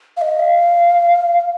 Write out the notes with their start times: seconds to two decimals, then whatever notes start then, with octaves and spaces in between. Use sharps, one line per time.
0.17 F5
0.21 D#5
0.39 F5